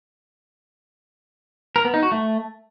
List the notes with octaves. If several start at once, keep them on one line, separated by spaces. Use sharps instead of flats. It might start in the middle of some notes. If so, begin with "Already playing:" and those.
A#4
B3
D#4
F#4
A3